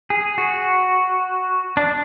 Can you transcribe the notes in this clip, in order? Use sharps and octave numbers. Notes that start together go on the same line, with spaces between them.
G#4
F#4
D4